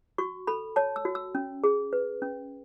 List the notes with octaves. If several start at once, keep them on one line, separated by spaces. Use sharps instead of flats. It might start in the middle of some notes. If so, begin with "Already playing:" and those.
F#4 C#6
A4 B5
C#5 A5
E6
F#4
E6
C#4
G#4
B4
C#4